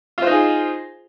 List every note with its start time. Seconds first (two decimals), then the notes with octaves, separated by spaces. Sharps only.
0.18 F4
0.22 C5
0.27 D#4
0.31 G#4